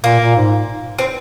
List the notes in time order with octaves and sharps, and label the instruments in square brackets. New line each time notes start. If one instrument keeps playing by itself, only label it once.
[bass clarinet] A#2 [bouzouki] A#3
[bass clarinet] A#2
G#2
[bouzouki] C4